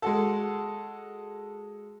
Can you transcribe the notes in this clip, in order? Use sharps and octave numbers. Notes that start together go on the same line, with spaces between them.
G#3 F#4 A4